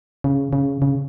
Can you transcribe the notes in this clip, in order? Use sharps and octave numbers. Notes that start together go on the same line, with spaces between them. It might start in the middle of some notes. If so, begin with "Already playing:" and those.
C#3
C#3
C#3